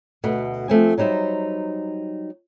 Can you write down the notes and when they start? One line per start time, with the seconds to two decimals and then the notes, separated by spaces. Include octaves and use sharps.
0.23 D2 B2 A3
0.68 F3 A3 C4 G#5
0.98 F#3 G3 D#4 C5 E5